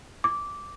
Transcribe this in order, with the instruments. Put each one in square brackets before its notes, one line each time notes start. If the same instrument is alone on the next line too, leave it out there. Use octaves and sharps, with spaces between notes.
[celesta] D6